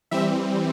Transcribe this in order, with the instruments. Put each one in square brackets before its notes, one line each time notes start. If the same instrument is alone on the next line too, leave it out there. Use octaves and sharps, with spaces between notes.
[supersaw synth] E3 G3 C4 E5